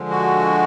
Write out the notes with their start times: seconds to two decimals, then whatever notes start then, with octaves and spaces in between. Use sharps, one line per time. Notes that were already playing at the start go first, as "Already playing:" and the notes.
Already playing: D3 F3 G#3
0.10 F#4